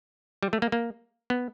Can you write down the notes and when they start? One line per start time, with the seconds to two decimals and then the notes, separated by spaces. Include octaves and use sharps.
0.43 G3
0.53 A3
0.62 A#3
0.72 A#3
1.30 B3